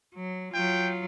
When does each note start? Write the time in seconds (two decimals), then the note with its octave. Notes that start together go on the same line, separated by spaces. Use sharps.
0.15 F#3
0.53 F#3 F4 G5